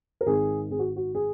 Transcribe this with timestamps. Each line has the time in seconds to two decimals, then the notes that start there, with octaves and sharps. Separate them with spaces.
0.21 A#4
0.26 G#1 G#4
0.71 G#1 G#4
0.79 F#4
0.96 F#4
1.15 G#4